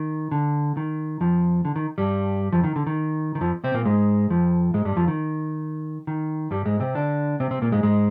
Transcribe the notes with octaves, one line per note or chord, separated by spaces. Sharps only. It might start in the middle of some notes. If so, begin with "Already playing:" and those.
Already playing: D#3
D3
D#3
F2 F3
D3
D#3
G2 G3
F2 F3
D#3
D3
D#3
D#3
F2 F3
C3 C4
A#2 A#3
G#2 G#3
F2 F3
G#2 G#3
G2 G3
F2 F3
D#3
D#3
G2 G3
G#2 G#3
C3 C4
D3 D4
C3 C4
C3 C4
A#2 A#3
G#2 G#3
G#2 G#3